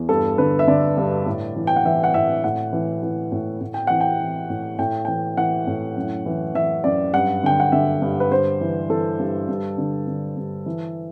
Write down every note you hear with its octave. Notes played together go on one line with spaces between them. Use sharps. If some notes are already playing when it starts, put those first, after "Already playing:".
Already playing: E2
G2 A4
D3 B4
E5
D3 D5
G2
A2
E3
G5
F#5
E3 E5
F#5
A2 E5
A2 F#5
E3
E3
A2
A2
G5
E3 F#5
G5
E3
A2
A2 G5
E3 G5
E3 F#5
A2
F#2
E3
E3 E5
F#2 D5
G2 F#5
D3 G5
F#5
D3 E5
G2
B4
G2 C5
E3
E3 A4
G2
G2
D3
D3
G2
E3